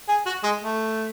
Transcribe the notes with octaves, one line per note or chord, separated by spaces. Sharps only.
G#4
F#4
G#3
A3